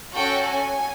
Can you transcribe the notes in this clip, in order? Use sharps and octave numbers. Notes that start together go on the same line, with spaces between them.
C#4 F#4 A4 G5
G#5